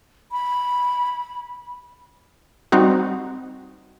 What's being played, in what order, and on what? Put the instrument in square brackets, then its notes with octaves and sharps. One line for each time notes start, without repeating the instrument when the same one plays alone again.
[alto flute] B5
[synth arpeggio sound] G3 C4 D#4 F#4